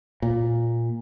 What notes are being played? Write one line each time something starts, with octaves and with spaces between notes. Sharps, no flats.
A#2